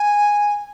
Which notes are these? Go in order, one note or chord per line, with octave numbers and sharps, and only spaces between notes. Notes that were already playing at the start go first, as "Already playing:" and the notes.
Already playing: G#5